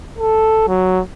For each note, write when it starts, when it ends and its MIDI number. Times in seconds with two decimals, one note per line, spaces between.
0.19 0.64 69
0.68 1.01 54